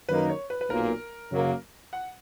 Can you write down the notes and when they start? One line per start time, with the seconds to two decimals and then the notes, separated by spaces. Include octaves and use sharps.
0.09 F#2 D#3 A#3 D#4 A#4 B4
0.29 C#5
0.50 B4
0.61 B4
0.70 B1 A#2 A#3 A#4
1.32 F#2 C#3 F#3 A#3
1.93 F#5